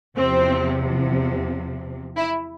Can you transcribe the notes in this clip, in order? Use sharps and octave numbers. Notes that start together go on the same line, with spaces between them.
E2 C3 F3 C4
E4